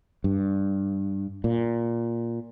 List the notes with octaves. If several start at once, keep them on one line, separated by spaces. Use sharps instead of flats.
G2
A#2